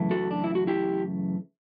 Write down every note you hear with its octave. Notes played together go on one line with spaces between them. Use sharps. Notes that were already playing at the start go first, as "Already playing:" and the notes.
Already playing: F#2 C#3 E3 A3
F#4 A4
D4
E4
F#4
E4 G4